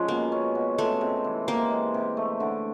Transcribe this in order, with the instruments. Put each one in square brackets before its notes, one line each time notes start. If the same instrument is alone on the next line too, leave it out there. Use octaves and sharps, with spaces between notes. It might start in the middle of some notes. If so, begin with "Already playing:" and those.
Already playing: [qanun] F3 [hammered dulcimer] G#3 C#4
[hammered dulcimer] B2 [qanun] A#3
[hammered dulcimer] C#4
B2
[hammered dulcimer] G#3 [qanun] A3
[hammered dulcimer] C3
E3
[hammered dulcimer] C3 [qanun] A#3
[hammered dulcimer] G#3
C3
A3
D3